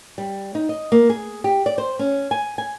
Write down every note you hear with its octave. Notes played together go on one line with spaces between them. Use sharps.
G3
D#4
D#5
A#3
G#4
G4
D5
C5
C#4
G#5
G#5